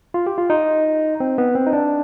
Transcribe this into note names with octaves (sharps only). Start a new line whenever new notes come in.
F4
G4
F4
D#4
C4
B3
C4
D#4
D4